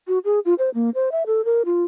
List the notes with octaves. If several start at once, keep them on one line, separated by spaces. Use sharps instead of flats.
F#4
G#4
F4
C5
A#3
C5
E5
A4
A#4
F4